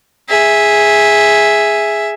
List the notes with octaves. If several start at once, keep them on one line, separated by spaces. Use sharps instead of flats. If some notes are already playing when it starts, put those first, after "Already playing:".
G#4 E5